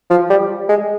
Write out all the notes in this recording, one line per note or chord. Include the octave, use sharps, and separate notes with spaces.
F3
G3
G#3